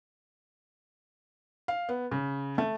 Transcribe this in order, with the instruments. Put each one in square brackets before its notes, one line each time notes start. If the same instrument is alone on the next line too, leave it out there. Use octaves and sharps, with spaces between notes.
[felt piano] F5
B3
C#3
A3